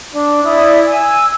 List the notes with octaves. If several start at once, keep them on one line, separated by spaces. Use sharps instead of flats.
D4
E4 D5 D#6
G#5 E6